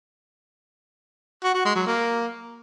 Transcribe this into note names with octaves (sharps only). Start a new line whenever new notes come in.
F#4
F#4
G#3
F#3
A#3